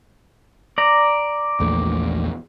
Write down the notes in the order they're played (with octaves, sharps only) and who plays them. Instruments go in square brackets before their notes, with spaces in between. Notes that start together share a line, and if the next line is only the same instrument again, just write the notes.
[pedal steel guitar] D5 A#5
[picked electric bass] A#1 E2 A3